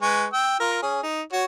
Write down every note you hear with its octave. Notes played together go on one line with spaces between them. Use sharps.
G#3 B4 C#6
G5 E6
F4 A#4
C#4 G#4
D#4
F#4 C#5